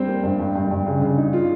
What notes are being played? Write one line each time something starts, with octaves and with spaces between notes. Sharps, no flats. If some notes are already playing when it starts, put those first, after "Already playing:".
Already playing: G3 C4 C5
A#3
G2
G2
G2
G2
C#3
C#3
D#4
F4